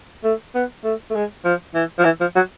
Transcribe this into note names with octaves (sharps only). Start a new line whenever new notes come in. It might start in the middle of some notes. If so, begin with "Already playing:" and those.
A3
B3
A3
A3
G#3
F3
E3
F3
E3
F3
F#3